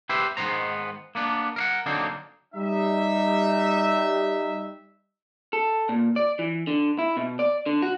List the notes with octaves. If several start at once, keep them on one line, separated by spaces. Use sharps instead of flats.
G4 B4 C5 E5
G#2 D#3 E3 B3 C5 A#5
A#3 B3 D4
A#4 F5 F#5
D3 F#3 A#3 C4 D4 D#4
G3 D#4 E5
A4
A#2
D5
E3
D3
E4
B2
D5
D3
F#4